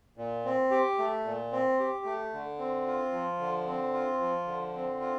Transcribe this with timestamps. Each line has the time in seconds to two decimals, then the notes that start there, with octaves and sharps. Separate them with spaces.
0.17 A#2
0.45 C4
0.71 G4
0.99 A3
1.25 A#2
1.52 C4
1.79 G4
2.05 A3
2.33 D3
2.59 C4
2.86 F4
3.12 F3
3.40 D3
3.67 C4
3.93 F4
4.20 F3
4.47 D3
4.74 C4
5.01 F4